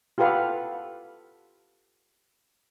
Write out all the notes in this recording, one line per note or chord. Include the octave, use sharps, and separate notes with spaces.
F4 G4 A4 B4 F5 F#5